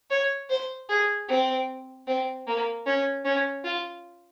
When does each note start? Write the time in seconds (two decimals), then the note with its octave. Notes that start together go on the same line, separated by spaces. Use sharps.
0.10 C#5
0.50 C5
0.89 G#4
1.28 C4
2.07 C4
2.47 A#3
2.86 C#4
3.25 C#4
3.64 F4